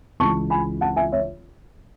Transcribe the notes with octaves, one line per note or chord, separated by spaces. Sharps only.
C#2 C#3 E3 A5 C#6
G#5 B5
F#5 A5
E5 G#5
C#5 E5